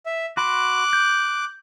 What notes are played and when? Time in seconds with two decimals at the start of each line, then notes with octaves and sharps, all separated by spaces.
0.06 E5
0.37 F#4 B5 C6 D6 F#6
0.93 G6